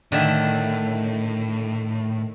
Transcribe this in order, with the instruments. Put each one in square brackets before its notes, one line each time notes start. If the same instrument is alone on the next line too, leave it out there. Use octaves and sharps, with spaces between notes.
[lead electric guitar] A2 [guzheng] D3 D#3 E5